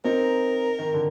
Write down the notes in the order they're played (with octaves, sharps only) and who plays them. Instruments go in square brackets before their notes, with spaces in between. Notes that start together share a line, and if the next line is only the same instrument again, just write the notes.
[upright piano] C4 D#4 [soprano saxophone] A#4
[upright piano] D#3
D3